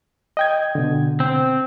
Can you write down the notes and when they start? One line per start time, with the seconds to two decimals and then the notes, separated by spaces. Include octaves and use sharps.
0.37 D#5 G5 G#6
0.75 B2 D3
1.20 C4